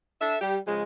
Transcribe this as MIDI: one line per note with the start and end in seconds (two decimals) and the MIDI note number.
0.21 0.36 62
0.21 0.36 69
0.21 0.36 76
0.41 0.56 55
0.41 0.56 67
0.66 0.83 49
0.66 0.83 53
0.66 0.83 56